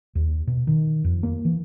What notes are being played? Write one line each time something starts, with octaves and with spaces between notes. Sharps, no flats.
D#2
B2
D#3
F2
A#3
E3